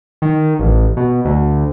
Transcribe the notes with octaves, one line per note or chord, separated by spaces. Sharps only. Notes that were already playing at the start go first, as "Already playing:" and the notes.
D#3
A1
B2
D2